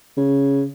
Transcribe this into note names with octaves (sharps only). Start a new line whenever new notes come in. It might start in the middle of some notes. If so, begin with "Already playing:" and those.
C#3